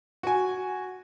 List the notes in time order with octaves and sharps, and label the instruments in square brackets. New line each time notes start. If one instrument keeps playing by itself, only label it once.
[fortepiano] F#4 G#5